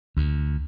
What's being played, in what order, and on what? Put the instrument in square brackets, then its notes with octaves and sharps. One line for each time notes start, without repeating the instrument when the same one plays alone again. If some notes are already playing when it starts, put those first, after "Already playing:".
[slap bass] D2